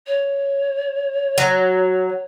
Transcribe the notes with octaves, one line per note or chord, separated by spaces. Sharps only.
C#5
F#3